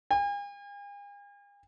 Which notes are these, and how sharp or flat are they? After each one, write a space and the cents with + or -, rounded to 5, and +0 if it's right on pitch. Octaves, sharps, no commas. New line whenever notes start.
G#5 -45